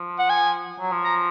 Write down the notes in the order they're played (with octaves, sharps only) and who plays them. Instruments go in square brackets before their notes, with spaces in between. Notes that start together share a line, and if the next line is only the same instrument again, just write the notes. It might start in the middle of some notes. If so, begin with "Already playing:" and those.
Already playing: [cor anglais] F3
[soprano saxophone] F#5
G#5
[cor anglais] F#3
F3
[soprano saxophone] A#5